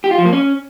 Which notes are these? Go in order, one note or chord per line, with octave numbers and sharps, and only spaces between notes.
G4
F4
F3
A#3
C#4